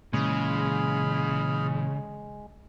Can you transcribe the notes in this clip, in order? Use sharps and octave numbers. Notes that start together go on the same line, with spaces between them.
A#2 C#3 E3 G#3 G#4 B5 F6